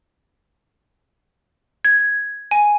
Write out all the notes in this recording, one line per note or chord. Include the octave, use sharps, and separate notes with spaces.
G#6
G#5